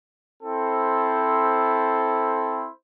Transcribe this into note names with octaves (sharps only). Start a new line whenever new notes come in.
C4 E4 A4 C5